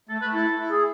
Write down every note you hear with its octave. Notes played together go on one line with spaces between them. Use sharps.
A3 A4
A3 B4
E4 A4
E4
G#4